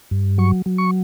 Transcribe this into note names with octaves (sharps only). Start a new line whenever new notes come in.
G2
F#3 C#6
F#3
C#6